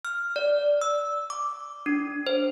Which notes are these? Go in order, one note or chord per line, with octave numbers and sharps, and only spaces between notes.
F6
D5
E6
D6
D4
C5